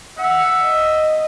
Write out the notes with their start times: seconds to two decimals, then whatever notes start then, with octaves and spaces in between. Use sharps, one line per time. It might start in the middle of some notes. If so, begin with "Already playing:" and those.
0.18 E5 F#5
0.63 D#5